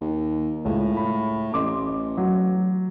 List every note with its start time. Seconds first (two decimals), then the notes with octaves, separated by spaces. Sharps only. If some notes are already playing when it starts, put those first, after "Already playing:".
0.01 D#2
0.65 C#2 A2
0.97 B5
1.54 A1 D#5 C6 D6
2.17 F#3